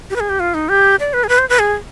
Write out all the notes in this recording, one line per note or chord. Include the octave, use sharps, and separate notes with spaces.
G4
B4
G#4
G4
F4
D#4
G4
D5
B4
G#4
B4
C5
B4
G#4